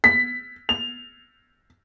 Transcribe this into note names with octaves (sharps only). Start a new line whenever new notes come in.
B6
F7